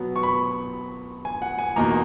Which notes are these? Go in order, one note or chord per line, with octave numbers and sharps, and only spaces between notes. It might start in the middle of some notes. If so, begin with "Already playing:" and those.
Already playing: B2 F#3 B3
C#6
B5
G#5
F#5
G#5
E2 B2 A#3 D#4 A#5